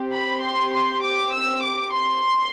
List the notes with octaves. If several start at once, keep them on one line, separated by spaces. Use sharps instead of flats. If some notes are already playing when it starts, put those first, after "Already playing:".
Already playing: C4 G4
B5
C6
C6
D6
E6
D6
C6